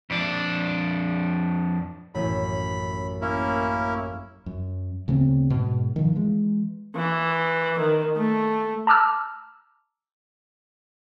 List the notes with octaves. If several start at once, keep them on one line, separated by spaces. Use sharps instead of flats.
F2 D4
A1 F#2 B5
A#3 C#4 E4
F#2
D2 C#3 B3 C4
G#2 B2
D#3 F3
E3 G#3
E3
D#3
A3
A5 A#5 D6 E6 F6